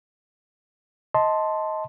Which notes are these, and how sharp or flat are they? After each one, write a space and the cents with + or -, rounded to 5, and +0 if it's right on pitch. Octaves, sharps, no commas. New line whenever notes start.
D#5 +20 A5 +0 C6 +0